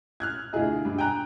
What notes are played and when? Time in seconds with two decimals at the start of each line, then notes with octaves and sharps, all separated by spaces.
0.20 F6 F#6 G#6
0.53 D2 E4 F4 G#4 D#5
0.85 G2
0.98 G5 G#5 A#5 F#6